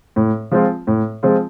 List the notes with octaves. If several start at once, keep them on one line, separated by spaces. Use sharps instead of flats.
A2
F3 G#3 C4 F4
A2
F3 G#3 C4 F4